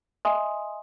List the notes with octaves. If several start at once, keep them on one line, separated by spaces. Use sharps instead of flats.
D#5 E5 G#5 C6 D#6